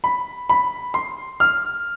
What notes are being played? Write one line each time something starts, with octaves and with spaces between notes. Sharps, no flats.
B5
B5
C6
F6